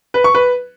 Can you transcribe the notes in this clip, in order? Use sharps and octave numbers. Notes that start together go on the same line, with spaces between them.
B4
C#6
B4